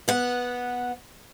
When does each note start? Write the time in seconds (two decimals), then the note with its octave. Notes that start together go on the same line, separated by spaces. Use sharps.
0.08 B3 F#5